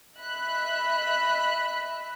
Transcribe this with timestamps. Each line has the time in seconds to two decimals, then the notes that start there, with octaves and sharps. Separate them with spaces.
0.16 D#5 E5 B5 F#6